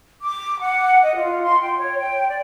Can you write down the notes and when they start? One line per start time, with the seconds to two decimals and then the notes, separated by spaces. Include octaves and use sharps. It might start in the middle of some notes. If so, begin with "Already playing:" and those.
0.22 D6
0.61 F#5
1.02 D#5
1.16 F4
1.42 C6
1.60 G5
1.77 C#5
1.98 G5
2.29 D5